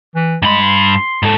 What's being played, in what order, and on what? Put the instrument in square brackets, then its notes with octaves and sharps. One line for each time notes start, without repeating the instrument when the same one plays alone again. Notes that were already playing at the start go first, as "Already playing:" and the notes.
[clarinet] E3
[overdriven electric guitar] G2 B5 [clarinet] G#3
[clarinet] C6
[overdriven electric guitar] G#2 A4